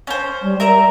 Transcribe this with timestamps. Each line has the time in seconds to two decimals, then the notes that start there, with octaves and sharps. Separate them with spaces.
0.07 C#4 C5
0.42 G3
0.60 G3 A#4 E5 A#5